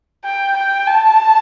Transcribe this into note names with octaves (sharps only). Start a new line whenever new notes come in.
G5
G5
A5